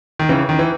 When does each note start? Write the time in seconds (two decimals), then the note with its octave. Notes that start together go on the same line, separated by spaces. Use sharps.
0.19 D#3
0.29 C#3 E3
0.49 D#3
0.59 E3